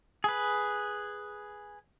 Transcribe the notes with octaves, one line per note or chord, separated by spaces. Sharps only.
G#4 B4